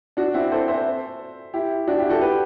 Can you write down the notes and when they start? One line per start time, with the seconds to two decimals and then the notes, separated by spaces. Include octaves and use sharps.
0.17 D4 F#4
0.34 C4 E4
0.51 A4 C5
0.68 C5 E5
1.54 E4 G4
1.87 D4 F#4
1.98 E4 G4
2.09 F#4 A4
2.21 G4 B4